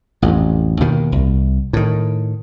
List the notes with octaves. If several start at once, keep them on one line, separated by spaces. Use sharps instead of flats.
A1 F2
D#2 B2 D#3
C2
A2 D#3